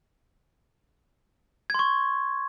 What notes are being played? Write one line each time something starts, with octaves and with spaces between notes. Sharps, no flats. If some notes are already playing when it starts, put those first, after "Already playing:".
C6 C#6 G#6